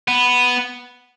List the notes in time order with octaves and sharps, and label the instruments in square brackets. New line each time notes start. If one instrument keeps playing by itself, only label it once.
[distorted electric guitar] B3